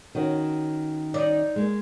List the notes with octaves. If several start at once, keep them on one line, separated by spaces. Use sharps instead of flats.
D#3 C#4 F#4
D#4 D5
G#3 A#3